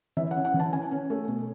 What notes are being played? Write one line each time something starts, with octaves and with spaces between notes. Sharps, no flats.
E3 E5
F#5
C#4
F#5
E3
A5
C#4 G#5
C#4
A3
B2